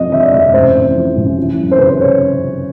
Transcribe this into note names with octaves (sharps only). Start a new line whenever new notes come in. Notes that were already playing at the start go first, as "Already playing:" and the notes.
Already playing: F2 F3 D#5
D3 E5
D5
F1 E5
A1 C5
A2
F3
A1
E3
F#2
C5
C#3 B4
C5
C#5